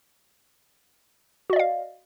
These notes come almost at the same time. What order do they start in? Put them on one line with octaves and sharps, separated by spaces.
F#4 D5 D#5 F5